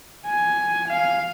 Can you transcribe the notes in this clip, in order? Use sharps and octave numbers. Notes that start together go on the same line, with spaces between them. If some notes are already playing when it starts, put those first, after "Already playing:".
G#5
F5